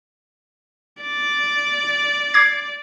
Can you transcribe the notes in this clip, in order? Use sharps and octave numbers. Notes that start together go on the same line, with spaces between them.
D5
D6 G#6 C7